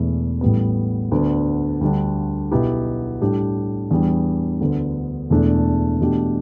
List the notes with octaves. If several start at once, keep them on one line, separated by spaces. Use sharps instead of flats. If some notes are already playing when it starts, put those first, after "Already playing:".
Already playing: E1 E2 E3 A3 E4
A1 A2 G3 B3
D2 D3 B3 D4
D2 D3 G3 D4
B1 B2 B3 E4 G4
A2 G3 D4 G4
E2 E3 G3 D4
D2 D3 B3
E1 E2 E3 A3 D4
E2 B2 A3 D4 G4